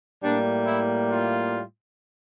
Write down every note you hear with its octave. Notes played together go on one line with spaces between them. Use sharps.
A2 G3 A#3 D4
E4
F4